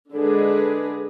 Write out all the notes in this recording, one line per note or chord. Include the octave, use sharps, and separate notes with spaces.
D3 G#3 D4 G#4 B4